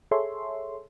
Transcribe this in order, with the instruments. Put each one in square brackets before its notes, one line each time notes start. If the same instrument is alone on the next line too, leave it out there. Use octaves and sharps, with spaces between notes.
[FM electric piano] G#4 A4 C#5 E5 C6